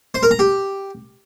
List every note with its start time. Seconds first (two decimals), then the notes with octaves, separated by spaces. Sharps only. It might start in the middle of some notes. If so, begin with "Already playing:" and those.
0.14 C5
0.23 A#4
0.31 A#5
0.39 G4